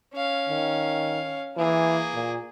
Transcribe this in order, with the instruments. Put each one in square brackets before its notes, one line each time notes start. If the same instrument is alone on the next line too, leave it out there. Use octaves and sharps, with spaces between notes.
[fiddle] C#4 F5
[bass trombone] D#3
[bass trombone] E3 [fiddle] A#3 G#4
[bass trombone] A#2